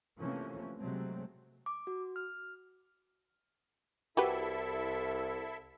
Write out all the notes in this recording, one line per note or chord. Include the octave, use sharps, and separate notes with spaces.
C3 E3 F3 A3 A#3 C#4
C3 F#3 G#3 A3 C4
D6
F#4
F6
C2 E4 F#4 G4 A4 B4 E5